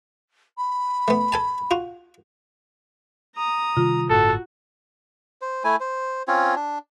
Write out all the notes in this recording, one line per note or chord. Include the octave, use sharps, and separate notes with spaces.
B5
A3 B3
A4 G#5 A5
F4 F#4
A#5 D#6
C3 D#3 G3 F4
G1 A2 D3 F#4 A4
C5
A3 E4 G#5
C5
C4 C#4 F4 C#5
D4